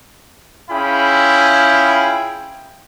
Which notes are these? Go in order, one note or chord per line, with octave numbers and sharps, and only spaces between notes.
C#4 E4 F4 G#4 G5 B5